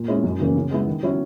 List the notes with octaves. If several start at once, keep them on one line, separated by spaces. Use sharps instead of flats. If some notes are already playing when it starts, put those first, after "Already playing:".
Already playing: A#2
G#3 C#4 E4
F#2
C#3 E3 A#3 C#4
C#3
G#3 B3 E4
D#3
F#3 C#4 E4